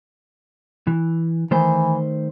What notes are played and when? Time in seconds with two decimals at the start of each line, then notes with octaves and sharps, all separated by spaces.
0.87 E3
1.51 D#3 E3 A3 C5